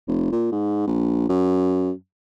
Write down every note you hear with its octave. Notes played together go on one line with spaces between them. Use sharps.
F1
A#2
G#2
A#1
F#2